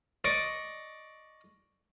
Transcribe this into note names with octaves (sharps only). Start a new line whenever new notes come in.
D5 D#5 C#6 D6